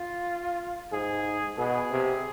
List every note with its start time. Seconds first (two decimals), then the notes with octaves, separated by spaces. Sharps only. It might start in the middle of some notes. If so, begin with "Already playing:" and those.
Already playing: F4
0.92 G#2 G#4
1.58 B2 G#4
1.91 C3